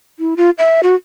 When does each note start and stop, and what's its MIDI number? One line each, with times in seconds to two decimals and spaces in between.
0.19 0.34 64
0.37 0.50 65
0.58 0.81 76
0.83 0.95 66